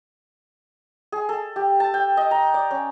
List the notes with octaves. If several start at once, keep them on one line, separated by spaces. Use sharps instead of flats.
G#4
A4
G4
A5
G5
D#5
A#5
D5
C#4